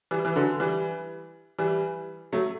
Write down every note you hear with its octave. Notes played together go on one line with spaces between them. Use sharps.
E3 G3
E3
D3 F#3
E3 G3
E3 G3
F#3 A3